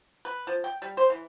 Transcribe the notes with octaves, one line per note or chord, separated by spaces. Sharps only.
B4
F3
G5
G3
C5
E3